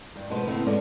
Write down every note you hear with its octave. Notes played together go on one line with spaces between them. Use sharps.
G2
B2 F3 G#3 A3 B4 C5
D#2 A2 C#3 A3 B3 C4
G#3 B3 C#4 A4 D5